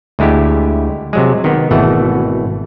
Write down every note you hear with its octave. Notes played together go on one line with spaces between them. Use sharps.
D2 G#3 A3 E4 G4
C3 F#3 G#3
D#3 B3
G#1 B2 E3 A3 F#5